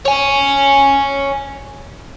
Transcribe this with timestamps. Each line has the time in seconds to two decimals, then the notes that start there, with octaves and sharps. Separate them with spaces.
0.05 C#5 G#5